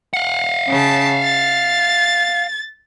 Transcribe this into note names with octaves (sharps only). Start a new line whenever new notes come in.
F5 F#5
C#3 A5
A6